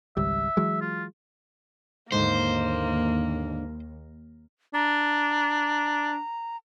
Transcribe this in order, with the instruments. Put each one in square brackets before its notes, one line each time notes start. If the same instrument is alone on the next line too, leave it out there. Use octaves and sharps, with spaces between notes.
[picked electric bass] G#1 C#2 G3 [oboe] E5
[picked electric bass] E3 F#3 G#3
[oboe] F4
[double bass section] D#2 [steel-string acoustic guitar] G#2 D3 [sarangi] A#3 [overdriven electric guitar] C5
[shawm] D4 [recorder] A#5